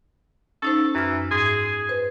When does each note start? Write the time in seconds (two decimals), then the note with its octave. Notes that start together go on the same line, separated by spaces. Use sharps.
0.62 C#4 D#4 A4 C5
0.95 F#2 E3 F6
1.31 G#2 G#4
1.89 B4 C5